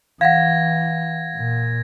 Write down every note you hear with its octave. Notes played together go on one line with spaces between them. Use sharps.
E3 F5 F#5 G#6 A#6
A#2